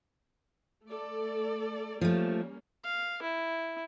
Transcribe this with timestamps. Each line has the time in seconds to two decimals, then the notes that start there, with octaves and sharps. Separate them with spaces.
0.86 A3 A4 D5
2.01 F3 G3 A3 A#3 C#4
2.84 F5
3.22 E4